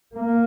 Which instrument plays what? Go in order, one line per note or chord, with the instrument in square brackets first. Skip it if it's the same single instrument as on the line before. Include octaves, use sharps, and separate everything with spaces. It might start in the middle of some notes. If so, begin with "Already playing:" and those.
[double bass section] A#3